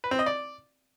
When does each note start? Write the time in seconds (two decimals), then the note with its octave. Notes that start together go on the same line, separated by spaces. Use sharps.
0.04 B4
0.11 C4
0.19 D#5
0.26 D5